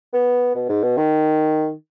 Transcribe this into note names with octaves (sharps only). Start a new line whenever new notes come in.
B3
B2
G#2
B2
D#3